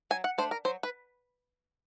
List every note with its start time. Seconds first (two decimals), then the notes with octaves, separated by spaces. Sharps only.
0.10 F#3 G#5
0.24 F#5
0.38 A3 D4 C5
0.51 A#4
0.65 F#3 C5
0.83 B4